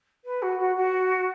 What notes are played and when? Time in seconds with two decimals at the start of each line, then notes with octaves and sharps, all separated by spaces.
0.24 B4
0.42 F#4
0.59 F#4
0.76 F#4